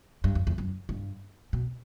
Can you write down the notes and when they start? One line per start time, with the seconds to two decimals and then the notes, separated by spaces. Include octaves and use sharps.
0.24 G2
0.35 F#2
0.47 E2
0.58 F#2
0.89 G2
1.53 B2